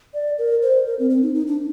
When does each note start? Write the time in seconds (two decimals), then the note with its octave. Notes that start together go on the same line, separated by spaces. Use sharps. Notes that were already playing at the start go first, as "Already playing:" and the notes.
0.14 D5
0.38 A#4
0.62 C5
0.86 A#4
0.99 C4
1.10 C4
1.23 D#4
1.34 D#4
1.47 D4